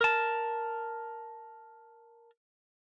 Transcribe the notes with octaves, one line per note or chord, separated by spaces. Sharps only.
A#4 A5